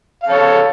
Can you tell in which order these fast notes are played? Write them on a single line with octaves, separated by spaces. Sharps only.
F5 A4 C#5